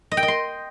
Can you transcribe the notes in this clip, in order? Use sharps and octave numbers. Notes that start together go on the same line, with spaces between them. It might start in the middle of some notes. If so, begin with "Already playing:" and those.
D#5
G5
D#5
C6